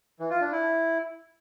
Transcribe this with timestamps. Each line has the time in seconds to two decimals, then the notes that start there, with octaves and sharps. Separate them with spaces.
0.20 E3
0.30 F4
0.41 D4
0.51 E4